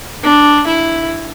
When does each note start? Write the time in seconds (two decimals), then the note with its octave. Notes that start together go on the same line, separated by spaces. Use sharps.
0.24 D4
0.67 E4